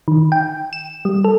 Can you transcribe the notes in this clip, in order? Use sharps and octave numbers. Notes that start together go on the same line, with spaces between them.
D#3
G5
E7
G3
A4